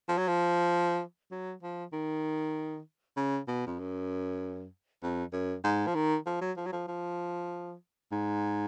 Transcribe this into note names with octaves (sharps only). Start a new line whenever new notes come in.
F3
F#3
F3
F#3
F3
D#3
C#3
B2
F2
F#2
F2
F#2
G#2
F3
D#3
F3
F#3
F3
F#3
F3
F3
G#2